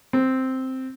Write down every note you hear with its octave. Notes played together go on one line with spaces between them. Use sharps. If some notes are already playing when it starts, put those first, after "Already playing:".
C4